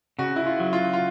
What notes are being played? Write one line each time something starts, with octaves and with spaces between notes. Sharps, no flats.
C#3 F#4
E4
F4
F#3
F4
F4